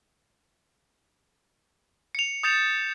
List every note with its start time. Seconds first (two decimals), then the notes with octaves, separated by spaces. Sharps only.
2.15 C#7 F7
2.43 D#6 G6 A6 C#7 E7 F7